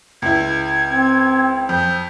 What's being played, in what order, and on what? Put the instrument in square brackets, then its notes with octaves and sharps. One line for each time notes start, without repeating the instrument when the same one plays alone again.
[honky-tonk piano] C#2 E4 [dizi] G#6
[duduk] C4
[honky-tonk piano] F2 [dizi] G6